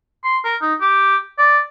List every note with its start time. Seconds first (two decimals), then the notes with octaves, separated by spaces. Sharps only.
0.24 C6
0.45 A#4
0.61 D#4
0.81 G4
1.38 D5